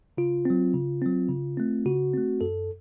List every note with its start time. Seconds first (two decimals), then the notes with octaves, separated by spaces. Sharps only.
0.18 C#3 F4
0.45 F#3 C4
0.74 C#3
1.02 F#3 C4
1.29 C#3
1.57 A3 C4
1.86 C#3 F#4
2.13 A3 C4
2.41 F#2 A4